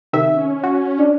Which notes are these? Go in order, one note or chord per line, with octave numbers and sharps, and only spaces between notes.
C3 D#3 E5
C#4
F#4
D4